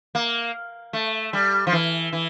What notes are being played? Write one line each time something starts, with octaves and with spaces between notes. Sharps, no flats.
A#3
A3
G3
F3
E3
E3